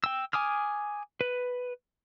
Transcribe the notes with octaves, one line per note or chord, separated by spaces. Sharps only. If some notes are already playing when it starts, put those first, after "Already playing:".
G5 E6
G#5 D6 D#6 F6
B4